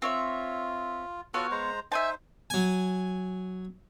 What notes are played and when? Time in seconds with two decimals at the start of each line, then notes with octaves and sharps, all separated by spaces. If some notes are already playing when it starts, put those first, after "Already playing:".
0.02 C4 F4 C#5 E5
1.34 B3 F4 F#4 A4 C#5 F5
1.51 G#3 C5 A#5
1.92 D#4 C5 E5 G#5 A5
2.50 F#3 G#5